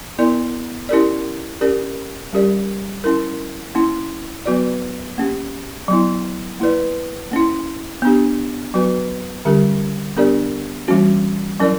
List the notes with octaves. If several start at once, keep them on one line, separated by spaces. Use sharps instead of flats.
B3 E4 A#4 D5
C#4 E4 G4 A#4 D5
C#4 G4 A#4 D5
G3 C#4 G4 A#4 D5
C#4 E4 A#4
A#3 C#4 E4
F#3 B3 F#4 B4 D5
A#3 C#4 G4
F#3 B3 E4
A#3 E4 B4 D5
A#3 C#4 E4
B3 D4 G4
F#3 B3 F#4 B4
D3 G3 C#4 G4 A#4
B3 D4 G4 A#4 D5
E3 G3 A#3 C#4 F#4
F#3 C#4 E4 A#4 D5